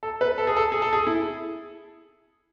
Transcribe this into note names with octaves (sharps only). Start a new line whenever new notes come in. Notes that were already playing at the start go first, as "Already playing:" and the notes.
A4
B4
A4
G#4
A4
G#4
A4
G#4
E4